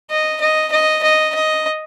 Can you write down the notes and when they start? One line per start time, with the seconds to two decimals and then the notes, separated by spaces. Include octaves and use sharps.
0.10 D#5
0.41 D#5
0.72 D#5
1.03 D#5
1.35 D#5